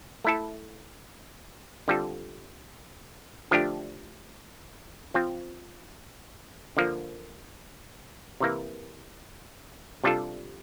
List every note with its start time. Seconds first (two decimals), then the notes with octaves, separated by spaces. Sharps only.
0.24 A3 E4 A4
1.88 D3 G3 C4 F4 A4
3.51 D3 F3 A3 D4 G4
5.14 F3 C4 F4
6.77 D3 F3 A#3
8.40 C3 E3 A#3
10.04 C3 G3 D4 F4 A4